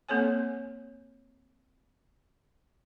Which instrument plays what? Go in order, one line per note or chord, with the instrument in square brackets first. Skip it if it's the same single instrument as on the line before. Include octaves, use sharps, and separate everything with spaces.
[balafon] A#3 C4 A4 C#5 G#5